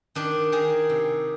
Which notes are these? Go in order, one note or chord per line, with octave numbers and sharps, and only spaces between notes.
D#3 D4
D#3 G#4
C3